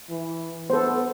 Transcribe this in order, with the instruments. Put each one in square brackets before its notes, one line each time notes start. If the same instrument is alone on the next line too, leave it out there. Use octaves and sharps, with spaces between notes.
[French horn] E3
[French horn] B3 [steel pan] A4 C5